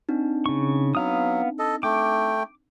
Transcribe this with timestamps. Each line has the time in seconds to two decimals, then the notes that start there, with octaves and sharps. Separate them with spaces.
0.09 C4 D4 D#4
0.46 C#3 C#6
0.95 F#3 B3 F5 D#6
1.59 A4 D#5
1.83 A3 G5 D6